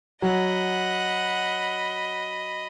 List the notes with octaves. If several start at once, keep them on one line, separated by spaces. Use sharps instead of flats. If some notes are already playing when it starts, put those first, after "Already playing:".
F#3 D#5 F#5 B5